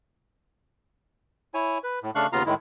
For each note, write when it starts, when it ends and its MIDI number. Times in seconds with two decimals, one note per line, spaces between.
1.54 1.78 64
1.54 1.78 73
1.54 1.78 80
1.84 1.99 71
2.03 2.11 45
2.15 2.27 49
2.15 2.27 57
2.15 2.27 62
2.15 2.27 77
2.15 2.27 85
2.15 2.27 90
2.33 2.43 39
2.33 2.43 49
2.33 2.43 59
2.33 2.43 65
2.33 2.43 77
2.33 2.43 82
2.46 2.54 45
2.46 2.54 51
2.46 2.54 56
2.46 2.54 64